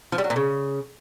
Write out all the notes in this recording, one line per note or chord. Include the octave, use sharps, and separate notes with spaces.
F3
G3
F#3
A#2
C#3